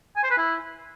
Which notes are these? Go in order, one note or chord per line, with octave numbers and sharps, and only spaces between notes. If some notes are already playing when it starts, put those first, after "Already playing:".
G#5
C5
B4
E4